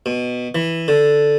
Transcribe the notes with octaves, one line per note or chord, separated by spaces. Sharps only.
B2
E3
D3